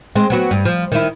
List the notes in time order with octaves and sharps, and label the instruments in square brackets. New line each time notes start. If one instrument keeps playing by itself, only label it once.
[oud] G#3 C4
F#3 B3 F#4
G2
F3
D#3 E4